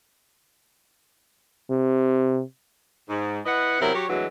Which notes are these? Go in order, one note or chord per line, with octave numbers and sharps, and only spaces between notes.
C3
G#2
E4 B4 D#5 F#5
C3 F#3 B3 E4 A#4
F#3 G4 C#5
D2 E3 F#3 G#3